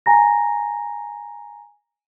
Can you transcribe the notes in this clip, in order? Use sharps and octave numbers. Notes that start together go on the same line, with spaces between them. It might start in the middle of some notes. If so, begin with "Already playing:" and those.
G#5 A#5 A#6